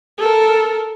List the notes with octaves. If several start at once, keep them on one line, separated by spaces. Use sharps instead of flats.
A4 A#4